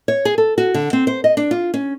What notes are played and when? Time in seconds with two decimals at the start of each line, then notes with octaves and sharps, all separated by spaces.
0.08 C#5
0.25 G#4
0.38 A4
0.58 F#4
0.74 D3
0.93 C4
1.07 C5
1.24 D#5
1.37 D4
1.51 F4
1.74 C#4